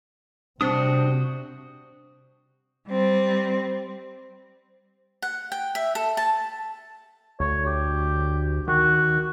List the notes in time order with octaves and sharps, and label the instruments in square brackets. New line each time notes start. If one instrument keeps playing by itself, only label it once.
[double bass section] C3 [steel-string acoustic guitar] G3 C4 [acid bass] D4 [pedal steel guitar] F#4 D#6
[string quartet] G3 C4
[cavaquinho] F#5
G5
E5
A4
A5
[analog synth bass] D2 [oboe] C#5
[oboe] G4
[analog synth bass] D#3 [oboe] F#4